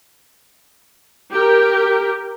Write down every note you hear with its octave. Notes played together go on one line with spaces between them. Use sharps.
G4 A#4